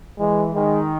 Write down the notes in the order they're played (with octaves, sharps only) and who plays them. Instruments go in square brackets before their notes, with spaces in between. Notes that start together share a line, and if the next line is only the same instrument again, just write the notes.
[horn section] E3 [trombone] G#3
[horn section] D#3 [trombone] G#3